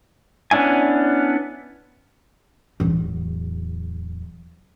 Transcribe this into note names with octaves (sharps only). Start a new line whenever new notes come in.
B3 C#4 D4 E4 G#5
D1 E2